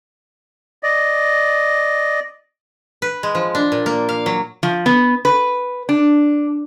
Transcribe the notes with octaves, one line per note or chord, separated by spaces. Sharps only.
D5 D#5
B4
G#3
F3
D4
A#2
A#3
F5
F#3
F3
B3
B4
D4